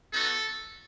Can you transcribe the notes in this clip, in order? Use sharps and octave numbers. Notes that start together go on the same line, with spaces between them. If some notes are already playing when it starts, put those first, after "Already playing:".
B3 D#4 F#4 A4